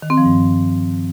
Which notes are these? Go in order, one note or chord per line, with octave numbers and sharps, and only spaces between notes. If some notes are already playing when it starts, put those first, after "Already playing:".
D#3
C4
F3
G2